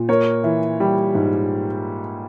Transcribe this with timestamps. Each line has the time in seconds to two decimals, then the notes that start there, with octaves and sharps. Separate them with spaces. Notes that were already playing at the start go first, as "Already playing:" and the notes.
Already playing: A#2
0.09 A#3 A#4 C#5
0.44 E3
0.80 G3
1.15 G#2